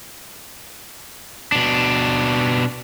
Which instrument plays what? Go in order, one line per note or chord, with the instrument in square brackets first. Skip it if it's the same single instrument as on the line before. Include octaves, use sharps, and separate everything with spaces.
[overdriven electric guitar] B2 D4